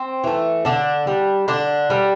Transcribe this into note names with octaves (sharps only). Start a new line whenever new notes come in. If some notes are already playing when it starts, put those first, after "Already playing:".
Already playing: C4
E3 A3
D3 D4
G3
D3 D4
G3